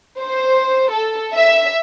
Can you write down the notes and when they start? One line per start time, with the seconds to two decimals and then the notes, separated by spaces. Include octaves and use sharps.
0.20 C5
0.91 A4
1.35 E5